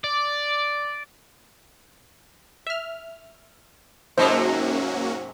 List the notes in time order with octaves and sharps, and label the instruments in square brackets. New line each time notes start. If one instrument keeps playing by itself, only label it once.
[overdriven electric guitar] D5
[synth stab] E5 F6
[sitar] G#2 C3 F#3 [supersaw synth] A#3 C#4 F#4 [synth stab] C5 D#5